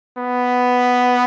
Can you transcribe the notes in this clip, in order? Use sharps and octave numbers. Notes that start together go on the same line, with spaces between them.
B3